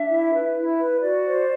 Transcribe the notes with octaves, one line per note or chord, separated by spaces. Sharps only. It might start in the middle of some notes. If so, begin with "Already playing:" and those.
Already playing: D4 E5
E4
B4
E4
B4
F#4 D5
C5